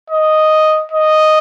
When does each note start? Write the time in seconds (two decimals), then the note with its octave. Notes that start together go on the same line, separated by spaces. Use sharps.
0.10 D#5
0.92 D#5